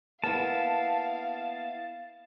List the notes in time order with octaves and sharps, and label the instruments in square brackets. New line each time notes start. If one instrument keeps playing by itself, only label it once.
[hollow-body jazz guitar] A#3 B3 E4 [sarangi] F5 [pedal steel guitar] A5